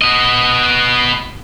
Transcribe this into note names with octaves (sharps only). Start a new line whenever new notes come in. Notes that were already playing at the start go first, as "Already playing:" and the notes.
B3 D#5